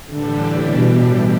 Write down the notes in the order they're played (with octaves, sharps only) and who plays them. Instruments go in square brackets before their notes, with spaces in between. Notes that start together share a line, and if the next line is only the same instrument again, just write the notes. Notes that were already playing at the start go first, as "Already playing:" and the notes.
[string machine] A2 E3 G3 D4 G4 [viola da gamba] D3
[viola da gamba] B2